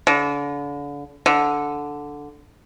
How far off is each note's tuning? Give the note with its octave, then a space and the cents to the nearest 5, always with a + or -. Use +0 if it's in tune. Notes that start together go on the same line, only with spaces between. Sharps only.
D3 -35
D3 -5